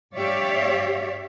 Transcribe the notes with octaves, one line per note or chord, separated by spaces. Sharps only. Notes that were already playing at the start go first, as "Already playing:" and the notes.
G2 G4 C#5 D5 E5 F5